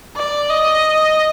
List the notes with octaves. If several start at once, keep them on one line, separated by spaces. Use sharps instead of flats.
D5
D#5